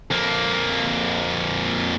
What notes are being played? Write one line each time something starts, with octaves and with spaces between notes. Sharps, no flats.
F2 A#3